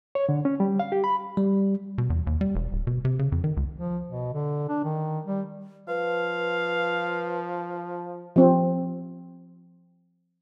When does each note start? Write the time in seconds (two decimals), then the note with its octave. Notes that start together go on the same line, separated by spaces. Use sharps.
0.15 C#5
0.29 D3
0.45 C#4
0.60 G3
0.79 F5
0.92 G4
1.04 B5
1.37 G3
1.98 B2
2.10 E2
2.27 D#2
2.41 G3
2.55 E1
2.72 D1
2.87 B2
3.05 C3
3.19 C#3
3.32 F2
3.44 D#3
3.57 C#2
3.77 F3
4.08 B2
4.34 D3
4.69 D4
4.84 D#3
5.25 G3
5.88 F3 B4 F5
8.36 F3 C4